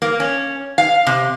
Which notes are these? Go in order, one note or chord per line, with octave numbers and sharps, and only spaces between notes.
A#3
C#4
F5
C3